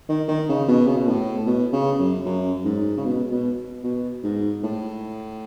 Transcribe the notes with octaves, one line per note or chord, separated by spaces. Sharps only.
D#3
D#3
C#3
B2
C#3
B2
A2
B2
C#3
F#2
F#2
G#2
C#3
B2
B2
B2
G#2
A2